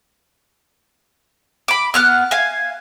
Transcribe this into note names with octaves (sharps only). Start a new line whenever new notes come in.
B5 D6
B3 F6 F#6
F5 G#5